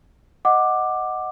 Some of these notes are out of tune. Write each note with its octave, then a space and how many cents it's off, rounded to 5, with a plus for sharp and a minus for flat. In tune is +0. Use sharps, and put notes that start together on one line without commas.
D#5 +0 F#5 +0 D6 +10